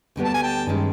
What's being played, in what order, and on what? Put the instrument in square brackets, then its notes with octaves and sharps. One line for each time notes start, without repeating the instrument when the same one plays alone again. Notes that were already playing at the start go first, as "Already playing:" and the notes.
[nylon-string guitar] D2 D3 G3 B3
[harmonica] A5
G#5
G5 A5
[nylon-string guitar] G2 D#3 G#3 C#4